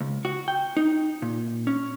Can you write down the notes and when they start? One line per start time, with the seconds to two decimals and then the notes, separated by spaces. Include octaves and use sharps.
0.01 C#2
0.25 F#4
0.48 G5
0.77 D#4
1.22 A#2
1.67 C#4